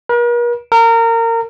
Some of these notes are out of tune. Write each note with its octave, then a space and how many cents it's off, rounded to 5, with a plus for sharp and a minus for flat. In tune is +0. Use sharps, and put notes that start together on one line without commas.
A#4 +45
A#4 -25